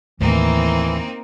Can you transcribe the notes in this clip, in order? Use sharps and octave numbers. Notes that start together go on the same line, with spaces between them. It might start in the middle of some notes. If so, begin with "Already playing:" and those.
D#2 A2 E3 A#3 C4 D#4